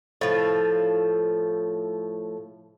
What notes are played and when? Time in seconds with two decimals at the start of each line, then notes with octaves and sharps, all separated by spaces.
0.21 A2 F3